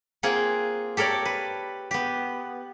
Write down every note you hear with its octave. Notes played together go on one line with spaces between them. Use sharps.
A#3 C4 F4 G#4 F#5 G5
G4 A4 A#4 C#5 D5
B4
B3 G4